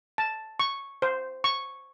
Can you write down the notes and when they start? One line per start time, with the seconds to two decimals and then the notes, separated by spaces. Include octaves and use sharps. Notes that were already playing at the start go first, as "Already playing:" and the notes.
0.18 A5
0.59 C#6
1.02 C5
1.44 C#6